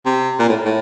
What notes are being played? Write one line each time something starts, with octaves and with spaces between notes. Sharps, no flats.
C3
A#2
A2
A2